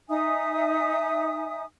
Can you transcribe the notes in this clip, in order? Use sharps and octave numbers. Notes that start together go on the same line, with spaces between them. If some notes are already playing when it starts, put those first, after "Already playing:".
D#4 E5 G#5 D#6